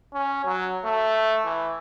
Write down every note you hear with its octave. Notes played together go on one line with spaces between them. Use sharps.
C#4
F#3
A3
E3